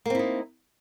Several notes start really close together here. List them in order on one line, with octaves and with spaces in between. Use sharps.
A#3 C4 E4 D#4